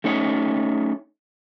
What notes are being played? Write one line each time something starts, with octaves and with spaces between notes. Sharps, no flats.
A3 C#4 D#4 C#5